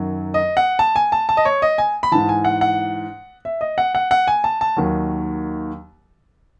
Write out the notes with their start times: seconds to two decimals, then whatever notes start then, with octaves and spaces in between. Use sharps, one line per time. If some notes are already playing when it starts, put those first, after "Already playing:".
Already playing: F#2 D#3 F#3
0.34 D#5
0.57 F#5
0.79 A5
0.96 G#5
1.12 A5
1.29 A5
1.37 D#5
1.45 C#5
1.62 D#5
1.78 G#5
2.03 B5
2.12 G#2 E3 A5
2.29 G#5
2.45 F#5
2.61 F#5
3.45 E5
3.61 D#5
3.78 F#5
3.95 F#5
4.11 F#5
4.28 G#5
4.44 A5
4.61 A5
4.77 D#2 D#3 F#3